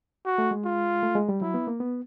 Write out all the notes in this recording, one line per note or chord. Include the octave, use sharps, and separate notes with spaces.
F#4
A3
G#3
F4
A3
G#3
G3
F#3 E4
B3
A#3
B3